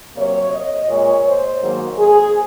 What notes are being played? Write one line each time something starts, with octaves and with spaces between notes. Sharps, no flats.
C3 F#3 A#3 C#5
D#5
A#2 G#3 C#5
C5
G#2 D#3 F#3 A#3
G#4